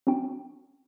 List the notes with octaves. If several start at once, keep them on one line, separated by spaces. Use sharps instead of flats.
C4 D4 F#4 G5